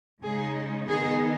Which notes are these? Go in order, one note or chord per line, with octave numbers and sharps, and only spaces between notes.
C#3 G#3 D#4 G#4
D#3 B3 D#4 G#4